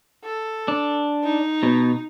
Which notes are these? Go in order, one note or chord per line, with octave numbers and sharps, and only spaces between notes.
A4
D4
D#4
B2